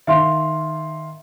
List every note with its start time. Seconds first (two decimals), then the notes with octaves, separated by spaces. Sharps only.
0.07 D#3 E5 F5 C6